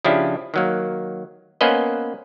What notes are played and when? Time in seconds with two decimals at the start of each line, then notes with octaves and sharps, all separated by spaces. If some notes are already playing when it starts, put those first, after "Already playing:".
0.05 C#3 F3 D4 E4 G4
0.54 D#3 F#3 A#3
1.61 A#3 B3 C#4 B4 C5 D#5